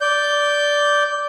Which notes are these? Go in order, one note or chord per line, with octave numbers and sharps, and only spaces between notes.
D5 G6